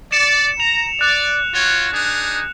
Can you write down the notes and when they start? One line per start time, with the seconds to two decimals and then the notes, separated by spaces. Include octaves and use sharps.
0.12 D5 C#7 E7
0.60 A#5 F7
1.01 D5 F#6
1.54 F4 F#4 C#5
1.93 D4 D#4 G#4